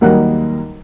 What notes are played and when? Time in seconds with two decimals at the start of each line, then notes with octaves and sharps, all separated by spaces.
0.01 D#2 F#3 G3 A#3 D#4 F#5